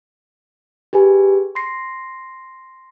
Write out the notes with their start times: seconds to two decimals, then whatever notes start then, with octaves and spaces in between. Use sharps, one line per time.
0.93 G4 G#4 B4 G#5
1.55 C6 A#6 C7